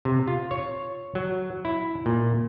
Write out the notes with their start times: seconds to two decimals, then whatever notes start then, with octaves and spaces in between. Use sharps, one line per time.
0.05 C3
0.28 F4
0.51 C#5
1.15 F#3
1.65 E4
2.06 A#2